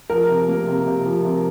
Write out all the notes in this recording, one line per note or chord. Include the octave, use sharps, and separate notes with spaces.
F3 A#4
C3
A#3
C3
C3
F3
C3